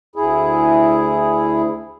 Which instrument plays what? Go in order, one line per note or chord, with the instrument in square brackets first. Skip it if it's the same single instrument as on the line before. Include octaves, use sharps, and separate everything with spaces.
[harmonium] D2 E4 G#4